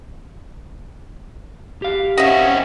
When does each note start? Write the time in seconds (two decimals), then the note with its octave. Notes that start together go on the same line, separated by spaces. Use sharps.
1.82 G4 F5
2.17 C4 C#4 F#4 D#5 E5